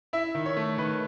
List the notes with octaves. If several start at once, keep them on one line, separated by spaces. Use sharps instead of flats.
E4 E5
D#3
C#5
A3
D#3 B4